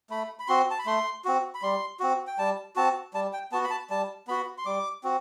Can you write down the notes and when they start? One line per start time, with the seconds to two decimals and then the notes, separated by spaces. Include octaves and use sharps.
0.10 A3 B5
0.39 B5
0.48 C4 F#4 C6
0.71 A5
0.79 B5
0.86 A3 C6
1.25 C4 F#4
1.54 B5
1.62 G3 C6
2.00 C4 F#4
2.27 G5
2.38 G3 A5
2.76 C4 F#4 A5
3.14 G3 A5
3.33 G5
3.52 B3 F#4 A5
3.64 B5
3.70 A5
3.90 G3 A5
4.27 B3 F#4 B5
4.58 C6
4.65 G3 D6
5.04 C4 F#4